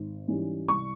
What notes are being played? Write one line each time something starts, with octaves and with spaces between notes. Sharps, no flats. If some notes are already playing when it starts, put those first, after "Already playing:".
Already playing: G#1
G#2 E3 G3 C#4
C2 C#6